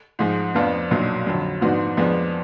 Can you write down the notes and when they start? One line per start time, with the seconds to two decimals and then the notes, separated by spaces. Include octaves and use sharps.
0.19 G#2 F3 G#3
0.55 F2 F3 B3 D4 F4
0.91 B1 A#2 F#3 D4
1.26 F2 D3 F#3
1.61 G#2 F3 B3 D4 F#4
1.97 F2 F3 G#3 B3 D4